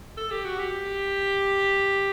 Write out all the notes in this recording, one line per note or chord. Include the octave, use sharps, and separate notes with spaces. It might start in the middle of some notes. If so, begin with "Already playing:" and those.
A4
G4
F#4
G4